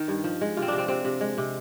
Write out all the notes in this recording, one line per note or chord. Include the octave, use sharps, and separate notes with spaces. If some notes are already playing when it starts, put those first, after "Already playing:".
Already playing: D#3
G2
F3
G#3
C3 F4
C4
C3 D4
C4
C3 C4
C3
G#3
C3